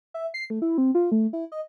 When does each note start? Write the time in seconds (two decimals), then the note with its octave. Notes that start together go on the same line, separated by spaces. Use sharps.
0.14 E5
0.34 C7
0.50 A3
0.62 E4
0.78 C4
0.95 F4
1.12 A3
1.33 E4
1.52 D#5